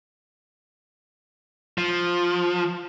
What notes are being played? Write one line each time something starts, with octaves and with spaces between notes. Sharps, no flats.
F3